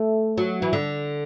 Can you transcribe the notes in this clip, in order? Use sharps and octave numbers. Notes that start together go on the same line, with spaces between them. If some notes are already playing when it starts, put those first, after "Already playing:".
Already playing: A3
F#3
E3
D3